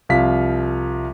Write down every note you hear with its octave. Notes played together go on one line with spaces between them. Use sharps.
C2 F3 F5 B6